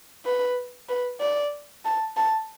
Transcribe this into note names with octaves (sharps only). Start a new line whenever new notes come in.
B4
B4
D5
A5
A5